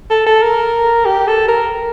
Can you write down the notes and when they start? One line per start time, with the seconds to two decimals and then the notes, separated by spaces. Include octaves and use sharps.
0.11 A4
0.26 A4
0.43 A#4
1.05 G4
1.27 A4
1.48 A#4